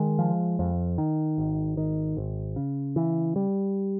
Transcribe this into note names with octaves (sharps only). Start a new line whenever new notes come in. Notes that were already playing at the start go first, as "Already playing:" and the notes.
Already playing: D#3 G#3
F3
F2
D#3
G#1
D#3
G#1
C#3
E3
G3